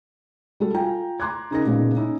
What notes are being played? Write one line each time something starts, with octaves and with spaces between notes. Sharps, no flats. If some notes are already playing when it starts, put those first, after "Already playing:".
G3 F#4 A4
F4 G5 G#5 A#5
A#5 C6 D6 F#6 G#6
C#3 D#4 A#4 A#6
A#2 C#3 G#3 A#3 B3 D#4
C#4 D#4 E4